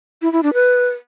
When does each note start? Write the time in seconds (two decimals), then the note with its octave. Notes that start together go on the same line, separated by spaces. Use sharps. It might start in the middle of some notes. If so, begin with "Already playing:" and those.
0.22 E4
0.33 E4
0.43 D4
0.54 B4